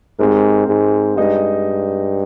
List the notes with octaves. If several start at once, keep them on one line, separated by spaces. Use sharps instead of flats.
G#2 G#3 C4 G4 A#4
G#2
G2 G#3 D#4 G#4 D#5